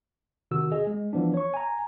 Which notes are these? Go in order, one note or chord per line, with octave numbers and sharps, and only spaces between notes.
C3 D#3 F#4 E6
G#4 D#5
G#3
E3 F3 B3 D4
C#5 C#6
G#5 A#5